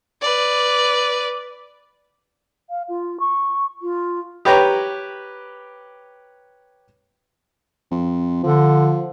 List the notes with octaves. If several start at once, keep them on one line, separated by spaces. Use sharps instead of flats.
B4 D5
F5
F4
C#6
F4
G4 B4 C#5 G5 A#5 D6
F2
D3 F3